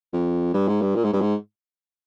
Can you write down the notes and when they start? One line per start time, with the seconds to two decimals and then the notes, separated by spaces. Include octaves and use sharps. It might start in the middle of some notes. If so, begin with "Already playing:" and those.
0.13 F2
0.54 G2
0.68 G#2
0.82 G2
0.95 A#2
1.04 G#2
1.13 G2
1.21 G#2